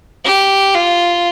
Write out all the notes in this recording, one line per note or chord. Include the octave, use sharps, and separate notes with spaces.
G4
F4